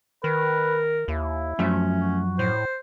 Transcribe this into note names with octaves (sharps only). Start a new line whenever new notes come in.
D#3 A#4 B4
D#2 E4
F#2 F3 A3 C#4 E5
F#4
A2 C5